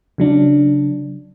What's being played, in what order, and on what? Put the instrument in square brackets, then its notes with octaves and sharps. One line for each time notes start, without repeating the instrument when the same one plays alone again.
[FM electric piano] C#3 F#3 D4